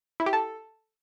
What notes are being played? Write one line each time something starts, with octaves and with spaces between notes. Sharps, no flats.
E4
G4
A4